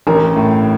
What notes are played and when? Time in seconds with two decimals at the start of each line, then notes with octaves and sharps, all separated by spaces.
0.07 A1 A#4
0.36 A2